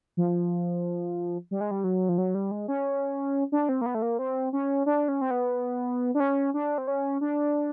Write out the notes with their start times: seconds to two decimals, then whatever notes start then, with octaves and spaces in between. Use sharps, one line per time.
0.17 F3
1.51 G3
1.61 G#3
1.71 G3
1.84 F#3
2.09 F3
2.18 F#3
2.35 G3
2.51 G#3
2.68 C#4
3.52 D4
3.69 C4
3.81 A#3
3.86 B3
3.95 A3
4.02 A#3
4.19 C4
4.53 C#4
4.86 D4
5.08 C#4
5.21 C4
5.31 B3
6.15 D4
6.20 C#4
6.54 D4
6.78 C4
6.88 C#4
7.21 D4